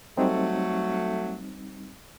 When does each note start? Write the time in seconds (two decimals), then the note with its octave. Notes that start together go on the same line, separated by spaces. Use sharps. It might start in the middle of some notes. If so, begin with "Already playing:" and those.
0.17 F#3 G3 A3 C4 D#4